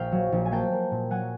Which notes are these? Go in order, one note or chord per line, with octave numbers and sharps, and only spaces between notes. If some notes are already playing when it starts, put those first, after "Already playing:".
Already playing: A#1 F5 G5
F#3
A#1
G#5
A#3 G5 A5
A#3
A#2
F#3 F#5 G#5